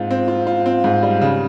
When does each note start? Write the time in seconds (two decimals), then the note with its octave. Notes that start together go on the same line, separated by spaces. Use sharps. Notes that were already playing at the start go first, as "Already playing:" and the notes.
Already playing: G#2 C4 F4
0.11 C4
0.28 F4
0.47 F4
0.66 C4
0.84 G#2
1.03 G3
1.21 C#3